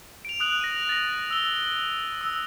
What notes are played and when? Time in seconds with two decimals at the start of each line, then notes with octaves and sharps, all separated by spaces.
0.25 D7 F7
0.40 D#6 F#6 F7 F#7
0.61 A#6 D#7
0.89 A6 A#6
1.31 E6 G7
2.21 E6